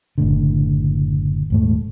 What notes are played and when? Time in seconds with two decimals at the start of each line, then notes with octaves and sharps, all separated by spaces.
0.18 F#1 A2 D3
1.50 D#1 G#2 A3